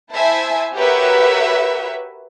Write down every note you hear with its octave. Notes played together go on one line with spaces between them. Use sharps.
E4 C5 E5 G#5 A5
F#4 G4 A#4 B4 C#5 E5